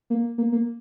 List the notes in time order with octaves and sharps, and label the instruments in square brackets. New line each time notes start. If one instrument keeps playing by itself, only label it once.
[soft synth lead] A#3
A#3
A#3